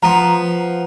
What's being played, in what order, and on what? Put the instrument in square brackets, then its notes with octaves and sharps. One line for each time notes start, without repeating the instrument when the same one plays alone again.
[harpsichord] F3 B3 [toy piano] A#5 C6